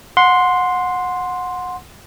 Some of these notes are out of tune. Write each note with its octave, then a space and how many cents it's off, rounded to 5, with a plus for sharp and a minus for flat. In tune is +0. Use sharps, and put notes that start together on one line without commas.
F#5 -25 C6 +0